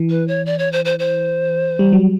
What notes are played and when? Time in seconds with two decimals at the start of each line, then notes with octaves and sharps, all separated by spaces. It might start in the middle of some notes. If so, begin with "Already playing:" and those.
Already playing: E3
0.10 B4
0.28 C#5
0.46 D5
0.59 C#5
0.72 C5
0.85 C5
0.99 C5
1.79 G3
1.93 F#3